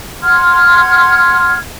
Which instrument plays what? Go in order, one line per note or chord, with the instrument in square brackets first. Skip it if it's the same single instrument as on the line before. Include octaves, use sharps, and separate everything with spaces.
[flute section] F#5 C6 F6 G#6